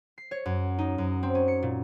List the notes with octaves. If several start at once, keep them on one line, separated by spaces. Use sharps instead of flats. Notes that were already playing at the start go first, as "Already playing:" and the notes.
C7
C#5
F#2
D#4
F#2
C4
C#4
C#7
A#2